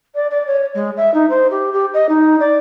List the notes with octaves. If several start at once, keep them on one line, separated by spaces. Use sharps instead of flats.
D5
D5
C#5
G#3
E5
D#4
C5
G4
G4
D#5
D#4
D5